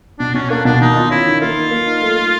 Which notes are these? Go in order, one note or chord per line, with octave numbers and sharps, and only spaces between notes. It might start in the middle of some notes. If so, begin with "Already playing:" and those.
B2 D4
B2 C#4
A#3 D4
B2 D4
D#3 D#4
F4
C#4 E4
D#3
A#3 F4
D#4
A#3
D#4
A3
A3